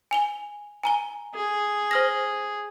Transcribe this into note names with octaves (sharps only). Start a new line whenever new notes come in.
G#5 F7 G7
G#5 A#5 G7
G#4
C5 F6 A#6